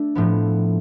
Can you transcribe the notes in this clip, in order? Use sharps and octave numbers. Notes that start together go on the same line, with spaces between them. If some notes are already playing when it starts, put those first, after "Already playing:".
Already playing: A3 D4
A2 F3 B3